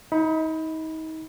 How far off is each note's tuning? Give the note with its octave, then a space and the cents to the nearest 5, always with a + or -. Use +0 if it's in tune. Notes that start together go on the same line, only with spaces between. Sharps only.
D#4 +35 B5 +0